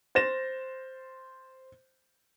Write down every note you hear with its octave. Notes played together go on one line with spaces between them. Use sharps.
C5 A6 A#6 E7